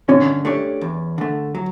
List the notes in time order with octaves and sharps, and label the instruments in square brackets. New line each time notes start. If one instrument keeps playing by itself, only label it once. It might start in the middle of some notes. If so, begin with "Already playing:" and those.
[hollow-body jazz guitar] D3 [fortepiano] C#4
[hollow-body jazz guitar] A3 D4 G4 C#5
E2
D3 A3
F#3